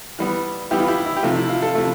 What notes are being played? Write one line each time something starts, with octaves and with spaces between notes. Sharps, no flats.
E3 G3 B3
E3 G3 B3 E4 G4
F4
E4 G4
E4
G4
C3 F3 A3 F4
E4
F4
F4 A4
C3 F3 A3 E4